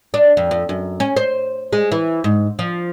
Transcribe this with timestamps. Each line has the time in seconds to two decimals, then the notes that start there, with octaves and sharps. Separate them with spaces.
0.14 D4
0.37 F2
0.51 F2
0.69 F#2
1.00 C#4
1.17 C5
1.73 G#3
1.92 E3
2.24 G#2
2.59 F3